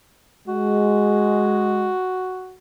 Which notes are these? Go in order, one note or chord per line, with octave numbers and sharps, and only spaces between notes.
G#3 F#4